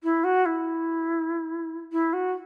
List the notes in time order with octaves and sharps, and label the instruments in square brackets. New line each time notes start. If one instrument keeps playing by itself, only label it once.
[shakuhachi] E4
F#4
E4
E4
F#4